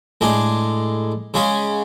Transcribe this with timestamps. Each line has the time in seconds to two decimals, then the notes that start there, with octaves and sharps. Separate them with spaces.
0.21 A2 G#3 D4 G#4
1.34 C#3 G#3 C#4 G#4